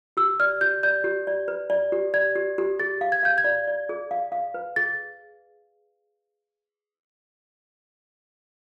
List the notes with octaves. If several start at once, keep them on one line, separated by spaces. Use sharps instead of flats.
G4 E6
D5 F6
G4 G6
D5 G6
G4
D5
B4
D5
G4
D5 G#6
G4
G4
G#4 A6
F5
G#6
F5 G6
G#6
D5
D5
G#4
F5
F5
B4
G#4 A6